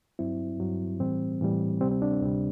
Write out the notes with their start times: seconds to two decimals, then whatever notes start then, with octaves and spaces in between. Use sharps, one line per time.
0.19 G2 F#3 C4 E4
0.60 G2 F#3
1.00 A2 E3 G3 C4
1.41 A2 E3 G3
1.81 D2 C3 G3 C4
1.91 C4
2.02 D4
2.12 C4
2.22 D2 C3 G3 C4